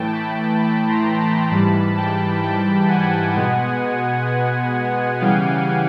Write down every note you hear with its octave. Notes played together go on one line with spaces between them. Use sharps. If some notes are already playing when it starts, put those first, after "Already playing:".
Already playing: A2 E3 A3 G5 A5
A5 B5
A5 B5
A#5 C6
A5 B5
G#2 E3 G3 A5 B5
G5 A5
G5 A5
F#5 G#5
B2 G#3 B3
C#3 E3 G3 F5 G5